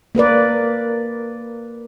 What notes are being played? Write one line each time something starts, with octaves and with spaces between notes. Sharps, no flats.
A#3 A#4 B4 D5